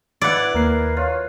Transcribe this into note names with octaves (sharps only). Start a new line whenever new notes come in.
E4 B4 D5 F#5
D#2 A#3 A#4 C7
F4 C#5